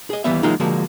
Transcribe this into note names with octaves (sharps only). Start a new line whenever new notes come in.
G#4 D#5
D#2 E3 G3 B3 E5
E3 F#3 G#3 A#3 D#4 F4
D3 F3 G#3 A#3 F#4